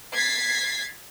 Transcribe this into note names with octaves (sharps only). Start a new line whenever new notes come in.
G#6 A6 B6 C7